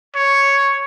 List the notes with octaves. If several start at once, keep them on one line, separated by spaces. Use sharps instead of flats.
C#5